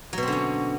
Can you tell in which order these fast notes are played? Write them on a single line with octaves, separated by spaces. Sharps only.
F#3 B2 C4 D3 C#4